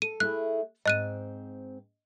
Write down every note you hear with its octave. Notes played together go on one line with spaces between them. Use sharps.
A4 D#7
A3 E4 G#4 F#6
G#2 C4 D#5 F#6 D#7